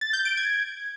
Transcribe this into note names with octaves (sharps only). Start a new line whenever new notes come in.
A6
G6
D7
G#6